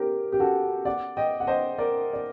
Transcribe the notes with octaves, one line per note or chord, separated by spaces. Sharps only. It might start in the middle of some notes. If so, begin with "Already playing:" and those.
Already playing: G4 A#4 C5
G4
F#4 A4
D5 F#5
D#5 G5
F#5
C5 D#5
A#4 D5
D5